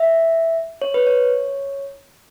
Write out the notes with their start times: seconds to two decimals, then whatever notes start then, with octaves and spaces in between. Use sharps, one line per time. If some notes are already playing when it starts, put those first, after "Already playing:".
Already playing: E5
0.82 C#5
0.94 B4
1.07 C#5